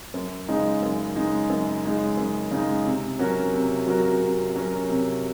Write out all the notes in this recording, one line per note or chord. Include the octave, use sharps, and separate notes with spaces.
F#2
C#3 G#3 D#4
F#2
C#3 G#3 D#4
F#2
C#3 G#3 D#4
F#2
C#3 G#3 D#4
C3
F#3 C#4 F#4 A#4
C3
F#3 C#4 F#4 A#4
C3
F#3 C#4 F#4 A#4
C3